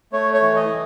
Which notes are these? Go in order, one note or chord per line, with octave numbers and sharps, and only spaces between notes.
A3 C#5
C#5
E3
D#5
E3